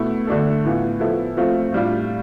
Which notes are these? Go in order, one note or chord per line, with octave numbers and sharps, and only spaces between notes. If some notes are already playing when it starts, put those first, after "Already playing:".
Already playing: B2 A3 E4
D3 A3 D4 A4
A2 E3 B3 F4
F3 B3 E4 A4
F3 A3 C4 F4
A2 G3 D4 F4